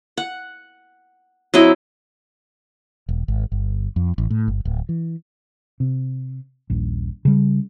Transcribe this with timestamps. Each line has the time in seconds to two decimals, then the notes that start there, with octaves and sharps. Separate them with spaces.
0.17 F#5
1.54 F#3 C4 E4 D#5
3.09 E1
3.28 G#1
3.52 G1
3.96 F2
4.18 A1
4.30 A2
4.48 G1
4.65 D1
4.89 E3
5.80 C3
6.70 D#1 A#1
7.25 C#3 G3